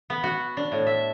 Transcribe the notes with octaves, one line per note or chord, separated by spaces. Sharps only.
B3
F#4
D4
A2
E5